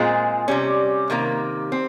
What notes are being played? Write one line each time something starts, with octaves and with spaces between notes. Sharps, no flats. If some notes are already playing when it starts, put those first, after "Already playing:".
Already playing: A#2 G#3 C4 F4 G#4
C3 G3 C#4
C3 D#3 A#3
C4